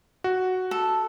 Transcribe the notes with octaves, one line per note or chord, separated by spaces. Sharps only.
F#4
A4